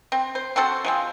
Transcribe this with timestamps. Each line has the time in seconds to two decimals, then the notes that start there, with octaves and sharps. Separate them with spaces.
0.12 C4
0.35 C5
0.56 C4 F#4 A4 C5
0.85 F3 G#3 C4